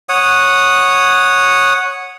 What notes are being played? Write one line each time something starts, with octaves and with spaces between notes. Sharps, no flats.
C#5 F#5 D#6